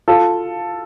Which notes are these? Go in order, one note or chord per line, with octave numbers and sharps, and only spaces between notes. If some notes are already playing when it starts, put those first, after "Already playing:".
F4 A4